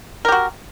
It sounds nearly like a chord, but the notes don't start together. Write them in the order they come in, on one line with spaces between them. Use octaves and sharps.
A#4 G4 F#4